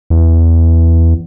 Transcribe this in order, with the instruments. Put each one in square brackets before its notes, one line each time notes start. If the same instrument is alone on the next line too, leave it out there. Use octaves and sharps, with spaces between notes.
[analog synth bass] E2